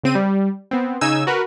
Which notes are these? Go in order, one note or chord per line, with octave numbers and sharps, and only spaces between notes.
C#3 C4 D#7
G3
B3 C4
C#3 D#4 G#5 E6 G#6
F#4 A#4 B4